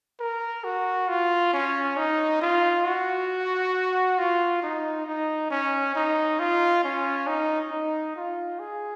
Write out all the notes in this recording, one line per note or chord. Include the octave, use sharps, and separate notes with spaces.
A#4
F#4
F4
C#4
D#4
F4
F#4
F4
D#4
D#4
C#4
D#4
F4
C#4
D#4
D#4
F4
G#4